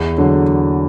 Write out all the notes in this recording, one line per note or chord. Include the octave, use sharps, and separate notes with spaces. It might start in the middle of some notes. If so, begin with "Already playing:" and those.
Already playing: E2
D3 F#3